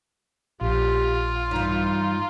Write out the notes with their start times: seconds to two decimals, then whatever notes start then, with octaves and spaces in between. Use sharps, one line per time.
0.61 A#1 F4 G4
1.51 G2 E3 D#4